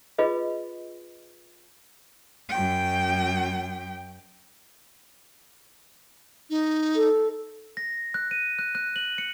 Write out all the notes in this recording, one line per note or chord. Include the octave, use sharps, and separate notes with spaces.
F4 G#4 B4 D#5
F#2 G5
D#4
A4
A#6
F#6
D#7
F#6
F#6
F#7
C#7